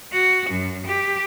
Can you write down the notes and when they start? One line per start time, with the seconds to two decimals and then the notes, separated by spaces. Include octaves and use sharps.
0.12 F#4
0.51 F#2
0.87 G4